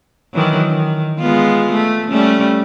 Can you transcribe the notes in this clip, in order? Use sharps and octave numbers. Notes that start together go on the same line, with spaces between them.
D#3 E3 F#3
D#3
G#3 B3 F4
A3
G3 A3 C#4